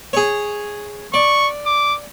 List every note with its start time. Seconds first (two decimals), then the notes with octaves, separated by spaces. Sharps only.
0.13 G#4 C#5
1.14 D5 C#6
1.66 D6